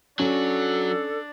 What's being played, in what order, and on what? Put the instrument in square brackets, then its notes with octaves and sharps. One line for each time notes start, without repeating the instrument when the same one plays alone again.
[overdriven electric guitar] F#3 F#4 [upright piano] C#4 [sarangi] D4 [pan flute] A4